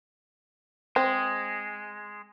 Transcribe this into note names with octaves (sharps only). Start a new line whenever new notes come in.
G#3 C4